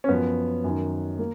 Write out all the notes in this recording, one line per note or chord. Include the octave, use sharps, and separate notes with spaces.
C#4
F#2 F3 B3
F#2 D#3
A#3